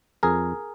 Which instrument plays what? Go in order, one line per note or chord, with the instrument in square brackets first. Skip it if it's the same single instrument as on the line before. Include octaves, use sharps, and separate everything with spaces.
[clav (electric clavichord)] F2 G#4 A#4